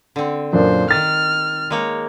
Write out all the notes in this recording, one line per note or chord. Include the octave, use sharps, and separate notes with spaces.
D3 C4
F#2 A#2 D4 C5
D#3 F6 A6
G#3 A#3 C#5